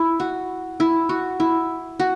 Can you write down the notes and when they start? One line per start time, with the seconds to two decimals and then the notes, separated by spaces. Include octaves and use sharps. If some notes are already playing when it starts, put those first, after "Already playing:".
Already playing: E4
0.20 F#4
0.80 E4
1.09 F#4
1.40 E4
2.00 F#4